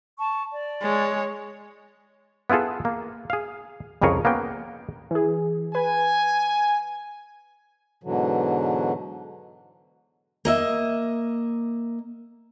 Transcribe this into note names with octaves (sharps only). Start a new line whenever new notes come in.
A5 C#6
D5
G#3 C#5
B3 E4 F4 G#4 A4
A#3
G#4 F5
C2 F2 C#3 G#4 A#4 C#5
A#3 B3 C#4 G5
E3 G#4
B4 G#5
G#2 B2 D3 E3 F#3
A#3 D#5 E5